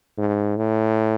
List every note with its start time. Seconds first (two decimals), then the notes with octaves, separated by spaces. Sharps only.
0.18 G#2
0.57 A2